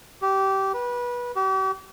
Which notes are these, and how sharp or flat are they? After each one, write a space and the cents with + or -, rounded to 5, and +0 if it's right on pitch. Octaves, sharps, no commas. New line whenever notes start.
G4 -20
B4 -25
G4 -45